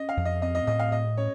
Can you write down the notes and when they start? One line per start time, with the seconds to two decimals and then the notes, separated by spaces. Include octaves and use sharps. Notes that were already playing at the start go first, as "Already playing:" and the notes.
Already playing: C#4 D#5
0.09 F5
0.17 F2
0.25 D#5
0.42 C4 D#5
0.55 D#5
0.67 A2 D#5
0.79 F5
0.92 A2 D#5
1.17 C#4 C#5